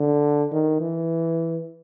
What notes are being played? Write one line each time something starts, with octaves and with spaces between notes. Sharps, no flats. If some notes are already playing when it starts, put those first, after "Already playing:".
Already playing: D3
D#3
E3